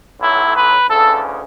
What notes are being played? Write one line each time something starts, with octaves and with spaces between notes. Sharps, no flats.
B1 A2 F#3 E4
B4
D2 C#3 E3 A4